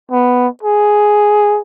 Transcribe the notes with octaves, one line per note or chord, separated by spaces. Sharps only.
B3
G#4